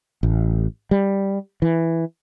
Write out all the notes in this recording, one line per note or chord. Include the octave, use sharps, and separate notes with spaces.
A1
G3
E3